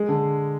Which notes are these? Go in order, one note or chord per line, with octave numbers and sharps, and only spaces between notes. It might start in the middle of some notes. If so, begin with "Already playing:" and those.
Already playing: G#3
D3